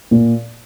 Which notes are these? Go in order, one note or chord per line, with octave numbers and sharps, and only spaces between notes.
A#2